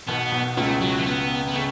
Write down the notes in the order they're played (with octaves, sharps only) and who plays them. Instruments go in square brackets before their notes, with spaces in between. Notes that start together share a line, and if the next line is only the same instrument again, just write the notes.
[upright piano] B1 B2 [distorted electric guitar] B3
[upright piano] B1 B2
[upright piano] C#2 C#3 [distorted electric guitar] A3
[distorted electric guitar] F#3
A3
B3
B3
[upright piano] C#3 [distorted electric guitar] A3